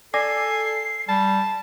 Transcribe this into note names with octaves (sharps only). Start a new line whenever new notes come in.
A4 D5 G#5 D6 A#6 C7
G3 A5